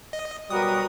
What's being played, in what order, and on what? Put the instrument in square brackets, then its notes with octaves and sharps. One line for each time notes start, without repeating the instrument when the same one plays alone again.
[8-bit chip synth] D#5
[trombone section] B2 F#3 G3 [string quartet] F#4 A#4 B4 [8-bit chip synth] D#6